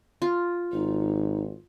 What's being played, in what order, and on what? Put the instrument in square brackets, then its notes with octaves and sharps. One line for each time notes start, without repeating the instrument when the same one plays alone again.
[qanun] F4
[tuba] G#1 [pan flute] D#4